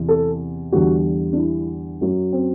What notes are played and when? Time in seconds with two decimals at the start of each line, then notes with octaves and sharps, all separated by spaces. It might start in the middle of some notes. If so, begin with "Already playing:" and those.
Already playing: E2 C3 E3
0.09 A4
0.72 E2 D3 G3 F#4
1.33 D4
1.37 E4
2.01 F#2 F#3
2.32 C4